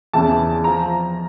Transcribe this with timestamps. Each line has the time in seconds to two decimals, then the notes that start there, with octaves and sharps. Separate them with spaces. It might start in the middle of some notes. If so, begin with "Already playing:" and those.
0.13 E2 C#3 E3 A5
0.64 F3 A#5